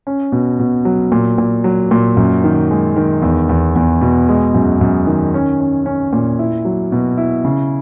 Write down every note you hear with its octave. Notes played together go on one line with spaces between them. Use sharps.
C#4
B2
B2
F#3
A#2
A#2
F#3
A#2
F#2
D#3
G#3
D#3
E2
E2
E2
B2
G#3
F#2
F#2
D#3
C#4
C#4
C#4
A#2
E4
F#3
B2
E4
C#3